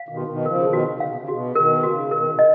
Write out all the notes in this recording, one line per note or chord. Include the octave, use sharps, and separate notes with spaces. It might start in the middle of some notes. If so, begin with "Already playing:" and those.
Already playing: F5
B2 D#3
F#4
B2 D#3
C#3 F3 A#4
B2 D#3
F#4
C#3 F5
B2
C#3
B2 F#4
B2 D#3 A#4
C#3 F#4
B2 D#3 A#4
B2
D#5